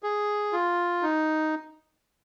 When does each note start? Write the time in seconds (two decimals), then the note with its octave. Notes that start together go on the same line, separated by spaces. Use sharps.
0.03 G#4
0.53 F4
1.03 D#4